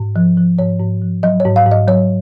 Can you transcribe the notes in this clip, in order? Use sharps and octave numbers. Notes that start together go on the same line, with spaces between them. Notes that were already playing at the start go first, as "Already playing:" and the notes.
Already playing: G#2
F3
F3
G#2 C#5
G#2
F3
F#3 D#5
C#5
G#2
F5
G#2
D#5
F#3 C#5